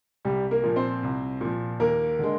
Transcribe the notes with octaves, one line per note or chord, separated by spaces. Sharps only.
C2 G3 G4
A#3 A#4
A#2 F3
C4 C5
C2
A#2 F3
D#2 A#3 A#4
D3 G#3